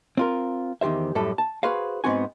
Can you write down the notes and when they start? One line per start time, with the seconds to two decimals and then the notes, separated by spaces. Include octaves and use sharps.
0.17 C4 F4 A#4
0.81 E2 D#3 G4 C5 E5
1.15 F#2 A2 G3 E4 A4
1.38 A5
1.63 F#4 G#4 B4 C5 F5
2.04 G#2 A3 B3 C4 F#4 G#5